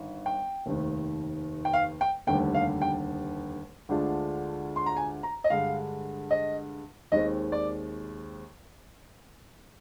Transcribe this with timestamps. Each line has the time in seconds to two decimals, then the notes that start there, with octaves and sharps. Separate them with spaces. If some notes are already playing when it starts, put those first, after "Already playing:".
Already playing: G1 D#3
0.26 G5
0.66 F1 D#2 D#3
1.65 G5
1.73 F5
2.01 G5
2.27 F1 D#2 D3 G3 G5
2.54 F5
2.82 G5
3.89 D2 D3 G#3 D4 F4
4.76 C6
4.86 A#5
4.97 G#5
5.23 A#5
5.44 D#5
5.50 G2 D3 G#3 F5
6.31 D#5
7.12 D#2 D#3 G#3 C4 D#5
7.52 D5